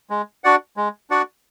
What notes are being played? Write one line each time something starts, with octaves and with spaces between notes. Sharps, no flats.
G#3
D4 F#4 D5 F#5
G#3
D4 F#4 D5 F#5